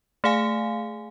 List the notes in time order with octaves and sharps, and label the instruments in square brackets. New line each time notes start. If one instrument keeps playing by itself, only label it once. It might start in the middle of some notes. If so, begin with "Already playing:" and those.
[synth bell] A3 G#4 F5 G#5